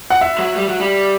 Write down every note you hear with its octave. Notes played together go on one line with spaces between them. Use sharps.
F#5
E5
F#3
G3
F#3
G3